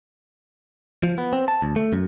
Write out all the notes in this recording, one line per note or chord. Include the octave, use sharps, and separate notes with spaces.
F3
B3
C4
A5
D2
A3
F#2